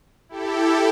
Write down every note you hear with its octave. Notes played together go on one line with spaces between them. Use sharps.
E4 G4 A4